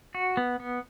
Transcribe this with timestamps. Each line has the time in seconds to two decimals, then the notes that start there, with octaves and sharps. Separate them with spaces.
0.15 F#4
0.37 B3
0.60 B3